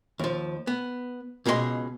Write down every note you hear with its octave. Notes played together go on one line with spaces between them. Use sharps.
D#2 F3
B3
C#2 B2 G#4 A#4 D#5 C6